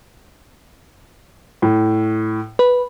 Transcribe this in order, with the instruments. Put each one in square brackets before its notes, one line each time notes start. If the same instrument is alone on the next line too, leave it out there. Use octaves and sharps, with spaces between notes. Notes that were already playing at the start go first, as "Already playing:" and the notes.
[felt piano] A2
[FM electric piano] B4